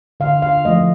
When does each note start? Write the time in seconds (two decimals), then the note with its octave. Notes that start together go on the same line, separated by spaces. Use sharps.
0.20 D3 F5
0.42 F5
0.65 F3 A3 D#5